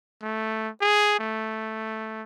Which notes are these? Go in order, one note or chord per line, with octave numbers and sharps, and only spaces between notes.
A3
G#4
A3